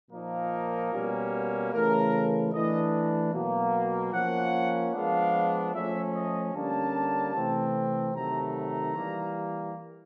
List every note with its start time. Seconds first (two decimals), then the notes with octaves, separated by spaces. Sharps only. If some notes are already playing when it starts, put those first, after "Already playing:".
0.11 A#2 F3 A#3 D#4 A#4
0.92 B2 G3 A#3 C#4
1.72 C#3 E3 A3 A#4
2.53 E3 A3 D4 D#5
3.33 B2 F#3 A#3
4.13 F3 A#3 C#4 F#5
4.94 F3 G#3 B3 D4 F5
5.74 F3 A3 C#4 E5
6.15 D#5
6.54 D3 G3 A#3 C#4 A5
7.35 C3 E3 A3 C4
8.15 C3 D#3 F#3 A3 A#5
8.55 A#5
8.96 E3 G3 A#3